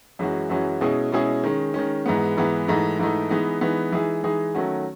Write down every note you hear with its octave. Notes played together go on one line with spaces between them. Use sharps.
F#2 E3 G#3 C#4 F#4
F#2 E3 G#3 C#4 F#4
B2 G#3 C#4 E4 G#4
B2 G#3 C#4 E4 G#4
D#3 G#3 C#4
D#3 G#3 C#4
G#2 E3 G#3 B3
G#2 E3 G#3 B3
G#2 E3 A3 D#4
G#2 E3 A3 D#4
E3 G#3 B3 D#4
E3 G#3 B3 D#4
E3 G#3 D#4 G#4
E3 G#3 D#4 G#4
D#3 F#3 A3 C#4 F#4